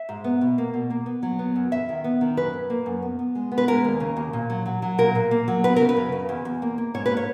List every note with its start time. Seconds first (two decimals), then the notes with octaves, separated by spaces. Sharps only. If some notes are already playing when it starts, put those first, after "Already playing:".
Already playing: E5
0.09 G#2
0.24 B3
0.41 B2
0.58 A#3
0.74 B2
0.90 A#3
1.06 B3
1.23 F#3
1.39 B3
1.56 F#2
1.71 E2 E5
1.89 D#3
2.04 B3
2.21 D#3
2.37 F#2 B4
2.53 F#2
2.70 A#3
2.86 F#2
3.02 B3
3.19 B3
3.35 G#3
3.52 B3
3.58 B4
3.68 G#3 A#4
3.84 D#2
4.00 C#3
4.17 D#2
4.33 A#2
4.50 F#3
4.66 F#3
4.82 F#3
4.98 A#2 A#4
5.15 A#2
5.31 A#3
5.48 F#3
5.64 B3 B4
5.76 C#3 A#4
5.89 B4
5.97 F#2
6.12 C#3
6.29 E2
6.45 E2
6.62 A#3
6.78 A#3
6.94 G#2 C#5
7.06 B4
7.11 A#3
7.17 C#5